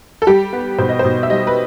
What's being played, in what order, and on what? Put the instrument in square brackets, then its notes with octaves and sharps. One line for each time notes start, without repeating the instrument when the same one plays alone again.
[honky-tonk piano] A4
G3 G4
B3
B2 C5
D#5
C5
B2
E5
G3 D#5
B4